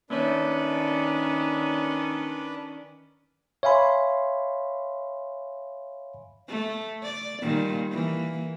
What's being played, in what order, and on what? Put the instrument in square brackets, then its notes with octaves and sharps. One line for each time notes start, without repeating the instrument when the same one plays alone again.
[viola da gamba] D#3 C#4 [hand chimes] A#3 C#5 [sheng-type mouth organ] D4 B4
[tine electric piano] C#5 E5 F5 G#5 B5 C6
[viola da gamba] A3
D5
A#2 D#3 G3
E3 A#3